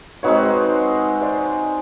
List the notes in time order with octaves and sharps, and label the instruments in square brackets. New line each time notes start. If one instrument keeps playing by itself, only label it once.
[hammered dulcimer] G#3 C4 D#4 F#4 [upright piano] B4 C#5
[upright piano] C5 D5